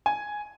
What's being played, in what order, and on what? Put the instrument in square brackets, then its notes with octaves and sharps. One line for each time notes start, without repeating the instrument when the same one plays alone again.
[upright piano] G#5